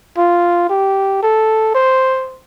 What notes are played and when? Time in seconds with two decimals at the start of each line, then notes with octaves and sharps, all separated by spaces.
0.18 F4
0.70 G4
1.23 A4
1.75 C5